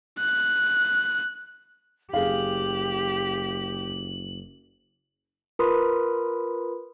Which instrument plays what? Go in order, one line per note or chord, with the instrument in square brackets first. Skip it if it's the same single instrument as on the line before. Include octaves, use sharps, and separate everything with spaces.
[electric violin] F#6
[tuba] F#1 [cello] G4 [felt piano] G#4 F5 [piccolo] F#7
[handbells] F4 A#4 B4 B5 C6 D#6